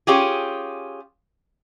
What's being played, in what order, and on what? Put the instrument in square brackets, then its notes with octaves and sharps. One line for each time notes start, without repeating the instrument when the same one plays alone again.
[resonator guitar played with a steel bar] C#4 F4 G4 G#4